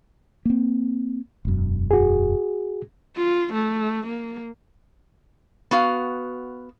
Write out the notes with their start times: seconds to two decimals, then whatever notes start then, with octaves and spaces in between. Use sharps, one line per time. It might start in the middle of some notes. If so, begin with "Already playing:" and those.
0.45 A#3 C4
1.45 E1 F#2
1.91 F#4 G#4
3.17 F4
3.54 A3
4.07 A#3
5.71 B3 F#4 F5